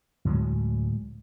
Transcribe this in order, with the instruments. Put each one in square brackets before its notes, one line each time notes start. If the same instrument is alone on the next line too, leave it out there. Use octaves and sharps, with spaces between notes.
[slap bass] D2 A2 F#3 G#3